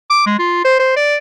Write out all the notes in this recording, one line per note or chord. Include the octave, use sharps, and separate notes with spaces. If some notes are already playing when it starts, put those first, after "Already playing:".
D6
G#3
F4
C5
C5
D5